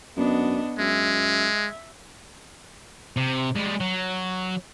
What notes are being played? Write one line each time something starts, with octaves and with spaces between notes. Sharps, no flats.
F#2 B3 D4 D#5
F#2 G#3 E5
C3
G3 G#3
F#3